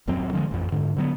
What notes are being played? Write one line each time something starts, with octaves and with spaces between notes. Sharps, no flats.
D#1 F#2 F#3 C4
D3 F3 G3 G#3
A1 F2
G#2 D3
D3 F#3 B3